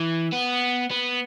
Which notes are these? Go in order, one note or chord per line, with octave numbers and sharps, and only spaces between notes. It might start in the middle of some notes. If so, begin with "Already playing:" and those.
Already playing: E3
B3
B3